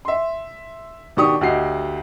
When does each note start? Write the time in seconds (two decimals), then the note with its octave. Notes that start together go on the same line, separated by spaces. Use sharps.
0.05 E5 C6
1.17 B2 D#3 D4 G4 C#6 D#6
1.41 D2 F#4 G4 D#5 C7